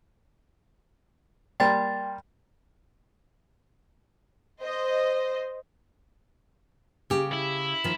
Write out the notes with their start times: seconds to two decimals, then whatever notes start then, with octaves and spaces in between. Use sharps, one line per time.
1.60 G3 A#3 A#4 G5 C6 A6
4.60 C5 D#5
7.10 C#3 G4
7.33 E4
7.84 D#3 F3